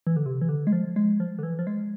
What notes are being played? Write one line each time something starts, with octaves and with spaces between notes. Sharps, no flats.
E3
D3
C3
E3
D3
G#3
F3
G#3
F3
D3
E3
F3
G#3